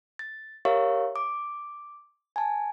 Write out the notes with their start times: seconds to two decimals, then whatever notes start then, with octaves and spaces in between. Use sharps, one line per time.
0.19 A6
0.65 G4 A#4 C#5 E5 F5 C#6
1.16 D6
2.36 G#5 A5